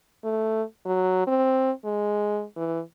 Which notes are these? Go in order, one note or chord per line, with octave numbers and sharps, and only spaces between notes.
A3
F#3
C4
G#3
E3